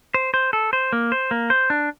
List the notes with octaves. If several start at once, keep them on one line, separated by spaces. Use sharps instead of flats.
C5
C5
A4
C5
A#3
C5
A#3
C5
D4